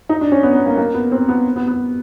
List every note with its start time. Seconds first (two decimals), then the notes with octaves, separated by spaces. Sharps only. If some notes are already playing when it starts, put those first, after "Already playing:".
0.09 D#4
0.21 D4
0.32 C#4
0.43 B3
0.55 B3
0.66 A#3
0.77 A#3
0.94 B3
1.12 C4
1.28 B3
1.56 B3
1.67 B3